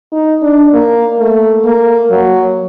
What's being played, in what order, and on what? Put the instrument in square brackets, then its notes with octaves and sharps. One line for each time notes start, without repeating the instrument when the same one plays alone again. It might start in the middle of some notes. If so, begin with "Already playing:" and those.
[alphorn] D#4
D4
A#3
A3
A#3
F#3